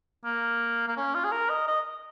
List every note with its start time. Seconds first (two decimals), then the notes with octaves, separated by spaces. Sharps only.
0.24 A#3
0.88 A#3
0.97 C#4
1.15 F4
1.24 G#4
1.31 A#4
1.50 D#5
1.67 D#5